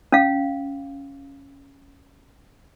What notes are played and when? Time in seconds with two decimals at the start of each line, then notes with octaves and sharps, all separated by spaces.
0.12 C#4 F5